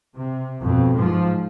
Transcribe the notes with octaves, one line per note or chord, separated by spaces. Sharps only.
C3
F2 B2
G#2 F3